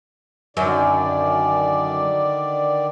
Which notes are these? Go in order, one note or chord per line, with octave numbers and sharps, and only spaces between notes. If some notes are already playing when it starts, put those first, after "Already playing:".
F#2 D3 D#3 D5